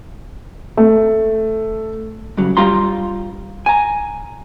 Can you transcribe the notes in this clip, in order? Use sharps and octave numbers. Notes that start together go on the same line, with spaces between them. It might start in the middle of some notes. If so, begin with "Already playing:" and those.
A3
G2 C#3 F#3
G2 G3 F4 A#5 C6
G#5 A#5